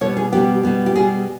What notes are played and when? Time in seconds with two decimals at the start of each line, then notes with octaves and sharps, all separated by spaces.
0.01 B2 G3 B3 C#5
0.17 G#4
0.32 B2 G3 B3 G4
0.63 B2 G3 B3
0.86 G4
0.96 B2 G3 B3 G#4